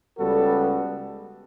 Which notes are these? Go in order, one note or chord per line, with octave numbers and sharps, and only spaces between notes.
C#2 C#3 G3 B3 F#4 A4